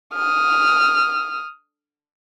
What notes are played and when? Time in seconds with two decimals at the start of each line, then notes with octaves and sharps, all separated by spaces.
0.14 D#6 F6